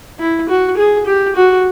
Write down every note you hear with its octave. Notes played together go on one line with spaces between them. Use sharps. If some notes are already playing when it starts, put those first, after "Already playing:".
E4
F#4
G#4
G4
F#4